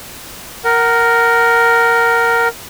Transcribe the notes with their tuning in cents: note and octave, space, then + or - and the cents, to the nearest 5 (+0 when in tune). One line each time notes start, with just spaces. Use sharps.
A#4 +0 F#5 +25